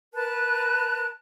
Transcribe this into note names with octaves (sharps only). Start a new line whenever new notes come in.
A#4 B4 A5 F#6